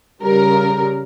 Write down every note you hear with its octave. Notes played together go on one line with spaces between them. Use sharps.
C#3 G3 A#4